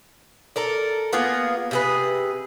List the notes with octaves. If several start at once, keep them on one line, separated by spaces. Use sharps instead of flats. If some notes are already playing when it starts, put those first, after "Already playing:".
A4 A#4 D5
A#3 B3 F4 G#4
C3 G#4 B4